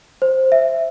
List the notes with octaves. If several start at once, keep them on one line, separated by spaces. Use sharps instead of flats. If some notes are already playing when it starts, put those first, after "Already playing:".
C5
E5